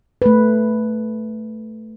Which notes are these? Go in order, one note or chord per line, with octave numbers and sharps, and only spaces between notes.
A3 B4